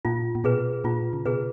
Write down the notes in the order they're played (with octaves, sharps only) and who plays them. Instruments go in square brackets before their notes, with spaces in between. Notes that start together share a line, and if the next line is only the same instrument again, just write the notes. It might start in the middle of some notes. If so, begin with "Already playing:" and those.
[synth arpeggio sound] A#2 [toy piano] F4
[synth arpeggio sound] A#2
[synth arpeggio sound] B2 [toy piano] G#4 B4
[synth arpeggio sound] A#2 [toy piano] F4
[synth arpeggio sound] C#3
[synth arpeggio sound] B2 [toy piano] G#4 B4